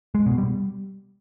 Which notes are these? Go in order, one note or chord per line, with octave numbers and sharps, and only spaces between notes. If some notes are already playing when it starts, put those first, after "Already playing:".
G#3
B2
G3